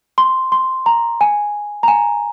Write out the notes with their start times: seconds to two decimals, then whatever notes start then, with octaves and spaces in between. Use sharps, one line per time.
0.18 C6
0.52 C6
0.86 A#5
1.21 G#5
1.83 A#5
1.88 G#5